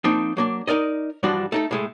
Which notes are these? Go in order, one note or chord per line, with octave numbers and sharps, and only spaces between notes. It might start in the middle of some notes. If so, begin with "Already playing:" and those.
F3 A#3 C4 D4 D#4
F#3 A#3 D4
D#4 A#4 D5 D#5
G2 E3 F3 G3 D4 F#4
A3 D#4 A4
A2 G#3 A3